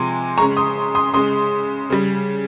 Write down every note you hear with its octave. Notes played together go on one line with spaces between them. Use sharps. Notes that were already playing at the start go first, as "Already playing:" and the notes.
Already playing: C3 F3 G#3 G#5 C6
C#3 G#3 A#5 C#6
C6 D#6
C6 D#6
C#3 G#3 C6 D#6
C#3 G3